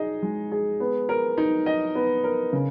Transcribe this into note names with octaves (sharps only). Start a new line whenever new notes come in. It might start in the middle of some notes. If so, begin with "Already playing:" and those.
Already playing: D#4 G#4 D#5
G#3
G#4
B3
A#4
D#4
D#5
B3
A#4
C#3